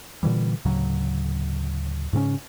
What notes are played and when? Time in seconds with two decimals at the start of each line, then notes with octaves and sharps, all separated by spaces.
0.23 A#2 D3 E3 G3
0.65 D2 A2 C#3 F#3
2.13 G#2 C#3 C4 C#4